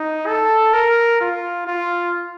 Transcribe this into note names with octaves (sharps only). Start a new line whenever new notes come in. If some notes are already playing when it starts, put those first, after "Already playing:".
Already playing: D#4
A4
A#4
F4
F4